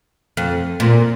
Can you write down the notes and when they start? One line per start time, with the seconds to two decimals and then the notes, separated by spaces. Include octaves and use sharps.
0.37 F2
0.80 A#2